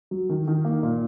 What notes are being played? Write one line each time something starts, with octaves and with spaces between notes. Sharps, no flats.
F#3
D#3
D#3
A#3
A#2